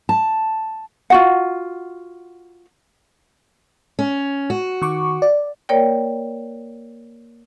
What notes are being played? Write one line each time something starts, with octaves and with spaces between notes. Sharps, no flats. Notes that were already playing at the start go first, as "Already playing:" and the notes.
A5
F4 F#4 F#5
C#4
F#4
D#3 C#6 D6
D5
A#3 A#4 C#5 D5 G5